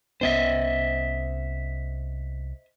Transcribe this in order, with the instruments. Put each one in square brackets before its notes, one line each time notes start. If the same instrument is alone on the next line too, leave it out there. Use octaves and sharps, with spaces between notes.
[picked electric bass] C2 B3 C#4 [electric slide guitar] C5 D#5 E5